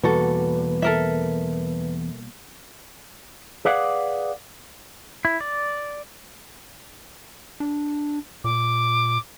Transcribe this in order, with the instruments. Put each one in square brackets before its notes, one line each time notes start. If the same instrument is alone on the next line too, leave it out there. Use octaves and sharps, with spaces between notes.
[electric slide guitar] E2 [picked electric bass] B2 G3 A#3 [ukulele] F#4 A4 [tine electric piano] B4
[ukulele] A4 A#4 E5
[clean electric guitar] G#4 B4 D5 F5 F#5
[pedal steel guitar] E4
D5
[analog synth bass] D4
[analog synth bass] A#2 [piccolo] D6